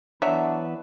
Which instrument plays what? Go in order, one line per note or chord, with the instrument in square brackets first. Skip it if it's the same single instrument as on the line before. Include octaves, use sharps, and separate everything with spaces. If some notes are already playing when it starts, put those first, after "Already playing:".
[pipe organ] E3 B3 B4 [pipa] F#3 [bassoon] D4 [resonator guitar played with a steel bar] E5